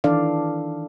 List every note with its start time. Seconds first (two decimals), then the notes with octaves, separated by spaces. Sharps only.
0.04 D#3 E3 D4 A4 D5 F5